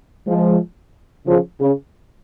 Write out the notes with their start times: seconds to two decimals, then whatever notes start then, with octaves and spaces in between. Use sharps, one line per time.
0.27 F3 G#3
1.27 C#3 F3
1.61 C#3